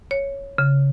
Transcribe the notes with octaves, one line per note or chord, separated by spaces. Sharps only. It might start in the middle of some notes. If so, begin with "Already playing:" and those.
C#5
C#3